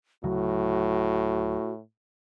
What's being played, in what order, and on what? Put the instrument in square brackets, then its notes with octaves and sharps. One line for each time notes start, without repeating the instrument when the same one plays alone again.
[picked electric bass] D2 C#3 F#3 [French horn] A2 [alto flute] F#4